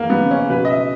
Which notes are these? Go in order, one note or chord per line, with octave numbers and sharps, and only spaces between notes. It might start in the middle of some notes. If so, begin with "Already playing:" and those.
Already playing: E2 D#3 A#3
B3
C#3
C#4
B2 B4
D#5
E5